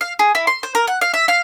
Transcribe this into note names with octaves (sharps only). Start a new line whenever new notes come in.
F5
G#4
E4
C6
C5
A#4
F#5
F5
E5
F5